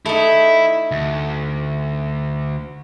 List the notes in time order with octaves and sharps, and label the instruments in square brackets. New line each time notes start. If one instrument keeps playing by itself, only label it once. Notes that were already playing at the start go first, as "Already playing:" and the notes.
[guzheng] A3 D#4 [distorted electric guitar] E4
[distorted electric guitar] D2